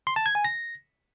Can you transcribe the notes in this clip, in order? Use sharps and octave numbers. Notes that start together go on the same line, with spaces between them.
C6
A5
G#6
G#5
A#6